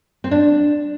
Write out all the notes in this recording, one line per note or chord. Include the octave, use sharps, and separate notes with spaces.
C4
D4